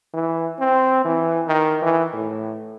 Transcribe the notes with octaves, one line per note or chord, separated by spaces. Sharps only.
E3
C4
E3
D#3
E3
A2